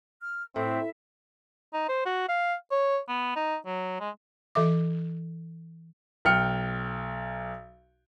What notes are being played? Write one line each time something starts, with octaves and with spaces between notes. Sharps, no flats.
F6
A2 C4 E5
D#4
C5
F#4
F5
C#5
B3
D#4
F#3
G#3
E3 A4 E5 D6
B1 G5 F6 C#7